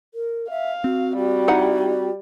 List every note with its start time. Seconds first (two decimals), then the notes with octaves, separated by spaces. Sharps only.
0.14 A#4
0.50 E5 F5
0.84 C4 F#4
1.17 G3 F#4
1.48 D#4 E4 F#5